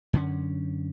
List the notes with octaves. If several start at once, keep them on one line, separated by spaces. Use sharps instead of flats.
F#2 D3 C#4